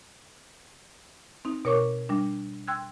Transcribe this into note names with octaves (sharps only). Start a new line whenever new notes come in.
C4 D#4
B2 A#4 C#5 C#6 D6
G3 D4
G5 C6 E6 F#6 G#6